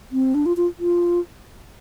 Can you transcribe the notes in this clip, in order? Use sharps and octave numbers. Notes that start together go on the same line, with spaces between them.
C4
D4
F4
F4
F4